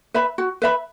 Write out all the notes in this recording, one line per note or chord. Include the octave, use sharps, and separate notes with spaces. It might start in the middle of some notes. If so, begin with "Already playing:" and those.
B4 E5 B5
F#4
B4 E5 B5